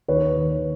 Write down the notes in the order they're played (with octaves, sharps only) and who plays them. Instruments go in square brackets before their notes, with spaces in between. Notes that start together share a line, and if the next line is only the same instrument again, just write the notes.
[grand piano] D#2 B4 C#5
D#3